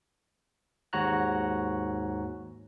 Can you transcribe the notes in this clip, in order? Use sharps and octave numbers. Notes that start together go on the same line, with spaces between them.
D#2 G#2 F#4 C#5 A#5 F#6